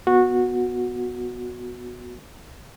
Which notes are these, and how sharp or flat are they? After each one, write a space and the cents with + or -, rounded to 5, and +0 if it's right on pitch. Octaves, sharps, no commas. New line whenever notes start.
B3 +0 F#4 -15